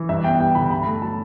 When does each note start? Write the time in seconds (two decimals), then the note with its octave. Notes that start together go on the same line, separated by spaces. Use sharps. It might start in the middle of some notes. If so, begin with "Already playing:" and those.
Already playing: E3
0.09 G2 E5
0.24 B3 G5
0.40 G3 G5
0.55 D3 B5
0.70 G2 B5
0.86 A3
1.02 F#3 A5